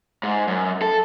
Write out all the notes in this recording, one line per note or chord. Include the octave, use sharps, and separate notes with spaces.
G#2
F#2
A4